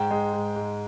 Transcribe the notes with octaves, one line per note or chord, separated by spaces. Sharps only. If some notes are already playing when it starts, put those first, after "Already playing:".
Already playing: G#2 G5
G#3
G#2
G#2